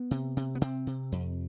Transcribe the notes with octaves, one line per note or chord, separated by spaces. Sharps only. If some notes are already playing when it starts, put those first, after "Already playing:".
Already playing: B3
C3
C3
B3
C3 C4
C3
F2